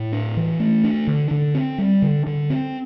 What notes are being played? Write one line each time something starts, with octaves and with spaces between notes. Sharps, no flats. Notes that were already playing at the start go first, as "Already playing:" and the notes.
Already playing: A2
D4
E3
A3
D4
D3
D3
C4
G3
D3
D3
C4